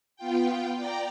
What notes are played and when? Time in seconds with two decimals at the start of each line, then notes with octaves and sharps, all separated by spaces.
0.16 B3 F4 G5
0.76 D5 G5 A#5